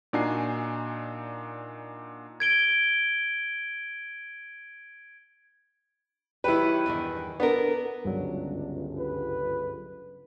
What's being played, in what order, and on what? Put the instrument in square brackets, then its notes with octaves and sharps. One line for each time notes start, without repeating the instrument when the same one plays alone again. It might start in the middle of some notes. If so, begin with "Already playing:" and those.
[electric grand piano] A#2 D4 D#4 F#4 G#5 C7
[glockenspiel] G#6 D7 G7
[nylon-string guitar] D#3 F#3 G4 [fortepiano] E4 B4
[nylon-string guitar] E2 G2 D#3
[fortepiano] B3 [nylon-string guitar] D4 A4 A#4
[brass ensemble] G1 C#2 [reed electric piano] G2 F#3 [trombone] D4
[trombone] B4